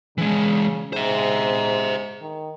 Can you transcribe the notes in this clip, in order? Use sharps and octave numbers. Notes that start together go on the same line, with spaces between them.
C#3 E3 G#3
G#2 C5 E5
D#3